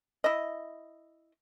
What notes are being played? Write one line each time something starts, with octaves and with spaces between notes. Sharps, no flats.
E4 D#5